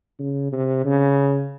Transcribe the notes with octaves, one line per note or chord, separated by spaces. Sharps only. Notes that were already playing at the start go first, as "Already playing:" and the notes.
C#3
C3
C#3